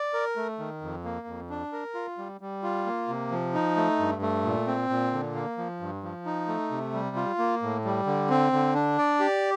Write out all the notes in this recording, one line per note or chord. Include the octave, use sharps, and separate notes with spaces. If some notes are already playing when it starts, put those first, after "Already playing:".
Already playing: D5
A#4
A3
D#3
F2
A#3
F2
D4
A#4
F4
G3
G3
F4
A#3
C3
F3
D#4
A3
G2
A3
A#2
C4
A#2
D3
A#3
F3
G2
F3
D#4
A3
C3
G3
F4
A#3
A2
G3
D3
C4
D3
D4
D5
G4